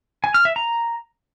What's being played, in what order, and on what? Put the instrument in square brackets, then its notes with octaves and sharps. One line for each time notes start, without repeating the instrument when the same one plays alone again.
[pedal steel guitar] G#5
F6
E5
A#5